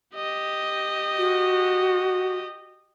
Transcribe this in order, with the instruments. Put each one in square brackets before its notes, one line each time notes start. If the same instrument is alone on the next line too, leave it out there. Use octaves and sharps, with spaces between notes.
[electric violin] G4 D#5
[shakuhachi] F#4